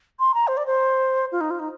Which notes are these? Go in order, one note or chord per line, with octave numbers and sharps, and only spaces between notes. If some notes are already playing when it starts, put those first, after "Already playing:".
C6
A#5
C5
D5
C5
F4
D#4
F4
D#4